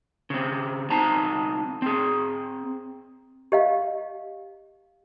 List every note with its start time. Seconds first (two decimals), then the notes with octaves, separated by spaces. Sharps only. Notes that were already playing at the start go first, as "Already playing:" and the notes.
0.30 C#3 C4
0.90 C2 C4 D#4 A5 A#5
1.82 C4 G#4
3.52 G4 D#5 F5